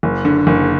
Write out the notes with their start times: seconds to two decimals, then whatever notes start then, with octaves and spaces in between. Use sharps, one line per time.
0.03 F#1
0.25 D3
0.47 F#1